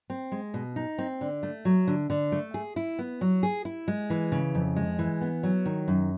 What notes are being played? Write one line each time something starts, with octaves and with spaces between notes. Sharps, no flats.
C4
G#3
B2
D#4
C4
D3
A3
F#3
D3
D3
A3
G#4
E4
B3
F#3
G#4
E4
G#3
E3
C#3
F2
G#3
E3
B3
F#3
D#3
F#2